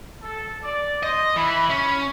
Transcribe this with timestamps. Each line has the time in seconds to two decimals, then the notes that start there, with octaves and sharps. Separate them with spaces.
0.22 A4
0.63 D5
1.03 C5 D#5
1.36 E3 B5
1.70 C#4